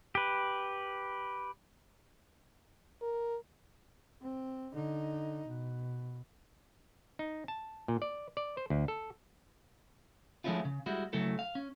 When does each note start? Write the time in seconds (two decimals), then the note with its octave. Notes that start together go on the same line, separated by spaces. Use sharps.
0.15 G4 B4
3.02 A#4
4.21 C4
4.72 D3 D#4
5.46 B2
7.19 D#4
7.48 A5
7.88 A#2
8.02 D5
8.37 D5
8.57 C5
8.70 D2
8.88 A4
10.44 F3 G#3 A3 C#4 E4 F4
10.65 C#3
10.86 G3 G#3 E4 F#4
11.13 C#3 F#3 A3 E4 A4
11.39 F5
11.55 C#4